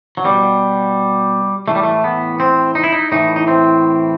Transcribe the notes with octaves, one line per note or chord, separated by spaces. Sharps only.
F#3
B2 G3
A2 E3 A3
G3
A3
B3
C4
D#4
E4
D#4
A2 E3 D#4
D#4
C4